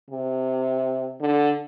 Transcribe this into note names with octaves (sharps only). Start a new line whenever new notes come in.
C3
D3